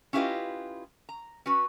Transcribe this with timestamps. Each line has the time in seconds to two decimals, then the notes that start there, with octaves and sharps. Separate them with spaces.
0.13 C#4 E4 F4 G4 B4 D#5
1.09 A#5
1.46 C#4 F#4 B4